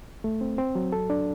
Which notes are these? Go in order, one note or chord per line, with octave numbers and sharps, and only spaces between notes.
A3
C4
C4
F#3
A4
D4